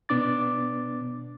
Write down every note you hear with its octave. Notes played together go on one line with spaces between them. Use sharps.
B2 B3 D4 D6 A6